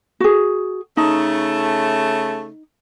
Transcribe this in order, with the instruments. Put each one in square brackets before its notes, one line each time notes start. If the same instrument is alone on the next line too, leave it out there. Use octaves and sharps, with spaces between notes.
[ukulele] F#4 G#4
[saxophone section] C#3 A3 [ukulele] D#4